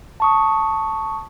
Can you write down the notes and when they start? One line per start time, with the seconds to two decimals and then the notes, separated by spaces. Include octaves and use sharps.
0.20 A5 C#6 D#6